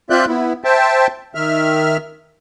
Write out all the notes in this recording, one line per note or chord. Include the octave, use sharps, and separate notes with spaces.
C4 F4 D5 E5 F#6 G6
B3 E4
C5 E5 G5 A5
D#3 E5 F6